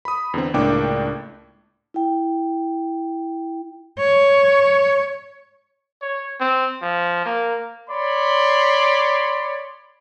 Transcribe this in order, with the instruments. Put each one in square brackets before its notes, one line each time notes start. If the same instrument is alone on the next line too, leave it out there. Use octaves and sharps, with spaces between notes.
[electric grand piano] B5 D#6
E2 D3 C4
C#2 A2 A#3 D4 G5 D6
[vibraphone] E4 G5
[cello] C#5
[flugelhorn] C#5
C4
F3
A#3
[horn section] C#5 D5 B5 C6